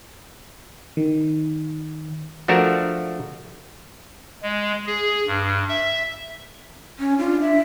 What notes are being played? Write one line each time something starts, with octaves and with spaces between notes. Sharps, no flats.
D#3
F3 A3 D4 F#4 A#4 E5
G#3
G#4
G2
E5
C#4
D4 F4
E5